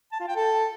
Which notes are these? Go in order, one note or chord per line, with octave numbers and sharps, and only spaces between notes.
A5
F4
G5
A4